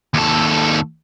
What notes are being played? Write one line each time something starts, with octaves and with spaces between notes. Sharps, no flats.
D#2 A4